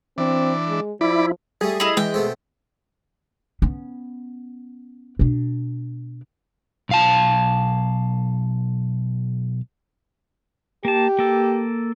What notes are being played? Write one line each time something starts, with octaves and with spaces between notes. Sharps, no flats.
E3 C4 D4
G#3
F3 E4 D5 B5
G3 A3 G#4
E4 G#4 D#5
E3 G#3 G5
B2 A3 C4
B3 C#4
B2 D4
B1 F5 A5
A#3 G4 A5
A#3 A4